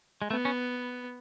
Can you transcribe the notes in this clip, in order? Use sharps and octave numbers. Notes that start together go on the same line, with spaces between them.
G#3
A3 B3
C#4